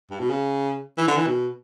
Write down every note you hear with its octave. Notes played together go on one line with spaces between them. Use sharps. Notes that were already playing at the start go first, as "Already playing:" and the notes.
G2
B2
C#3
E3
D3
E3
B2